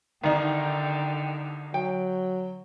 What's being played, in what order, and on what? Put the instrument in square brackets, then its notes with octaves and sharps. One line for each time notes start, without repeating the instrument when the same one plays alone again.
[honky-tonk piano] C2 D#4 [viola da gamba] D3 [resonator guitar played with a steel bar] D#3 [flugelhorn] G5
[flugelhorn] F#3 [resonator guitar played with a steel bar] G5